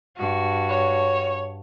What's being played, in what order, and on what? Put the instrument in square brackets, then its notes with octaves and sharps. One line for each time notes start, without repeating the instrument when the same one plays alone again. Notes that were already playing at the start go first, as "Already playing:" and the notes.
[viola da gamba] G2 F#4
[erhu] C#5